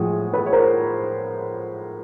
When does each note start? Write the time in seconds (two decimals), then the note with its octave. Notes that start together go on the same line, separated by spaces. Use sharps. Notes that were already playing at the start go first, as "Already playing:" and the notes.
Already playing: A2 F3 G#3 F#4 G#4
0.33 A4 B4
0.46 C#5
0.53 A#4 C5